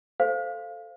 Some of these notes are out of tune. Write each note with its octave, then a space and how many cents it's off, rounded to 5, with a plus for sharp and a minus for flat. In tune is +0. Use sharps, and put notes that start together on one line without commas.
A4 +0 C5 +0 F5 -10